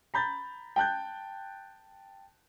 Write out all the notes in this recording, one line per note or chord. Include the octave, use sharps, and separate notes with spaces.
A#5 B5 G6 A6
G5 A5 F#6 G6